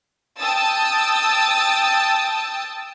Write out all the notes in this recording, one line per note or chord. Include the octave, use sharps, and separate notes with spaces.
G5 A5 D#6 E6 A6